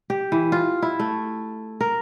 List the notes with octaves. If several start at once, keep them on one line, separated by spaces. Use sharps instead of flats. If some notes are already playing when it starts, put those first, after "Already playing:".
G4
E3
F4
E4
A3
A#4